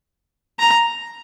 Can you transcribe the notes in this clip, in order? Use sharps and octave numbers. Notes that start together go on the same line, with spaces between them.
A#5